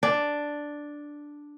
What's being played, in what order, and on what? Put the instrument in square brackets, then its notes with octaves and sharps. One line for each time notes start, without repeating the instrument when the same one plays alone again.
[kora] D4